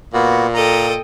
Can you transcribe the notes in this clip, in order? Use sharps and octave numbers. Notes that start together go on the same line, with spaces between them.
A#2 A#3 B3 F#4
A4 D#5 G5 A#5